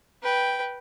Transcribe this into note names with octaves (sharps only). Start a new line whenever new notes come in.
B4 G5